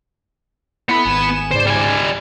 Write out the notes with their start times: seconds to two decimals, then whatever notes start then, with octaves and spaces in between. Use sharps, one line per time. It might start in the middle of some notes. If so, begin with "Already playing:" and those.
0.89 B3 E4 A4 B5
1.05 G#1 G#5 E7
1.51 C#2 G#2 C5 D5
1.67 G3 G#5